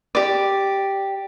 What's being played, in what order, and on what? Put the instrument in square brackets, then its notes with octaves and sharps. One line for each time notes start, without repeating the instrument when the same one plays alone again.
[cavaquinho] G4 D5